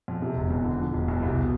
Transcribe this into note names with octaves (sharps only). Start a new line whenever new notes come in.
F2
C3
E1
E2
D3
F3
E1
E2
C2
B2